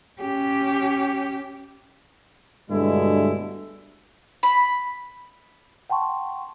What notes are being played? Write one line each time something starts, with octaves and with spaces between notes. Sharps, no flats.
C#4 G4
G2 B2 D3 G#3 A3 E4
B5
F#5 G5 A5 C6 C#6